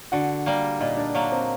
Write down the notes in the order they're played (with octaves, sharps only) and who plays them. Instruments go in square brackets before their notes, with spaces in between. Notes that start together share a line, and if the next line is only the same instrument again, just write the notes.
[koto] D3 [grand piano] F#4 F#5
[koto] G3 A#3
[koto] A#2 [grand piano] D#4 D#5
[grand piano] D4 D5
[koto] F#3 A#3 [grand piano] D4 D5
[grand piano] C4 C5